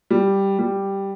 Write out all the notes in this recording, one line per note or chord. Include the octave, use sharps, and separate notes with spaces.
G3
G3